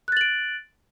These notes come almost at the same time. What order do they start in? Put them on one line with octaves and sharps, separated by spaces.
F#6 A6 F#7 D7